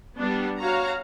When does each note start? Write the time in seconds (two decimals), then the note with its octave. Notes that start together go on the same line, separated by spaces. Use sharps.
0.18 G3 B3 D4
0.61 F#4 C#5 F5 A#5